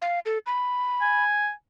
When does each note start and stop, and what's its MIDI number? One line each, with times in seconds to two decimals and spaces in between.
0.02 0.19 77
0.26 0.38 69
0.46 1.23 83
1.01 1.51 80